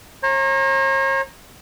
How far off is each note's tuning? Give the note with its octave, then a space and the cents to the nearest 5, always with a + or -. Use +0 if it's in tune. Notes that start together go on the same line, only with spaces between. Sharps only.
C#5 -45 A#5 +0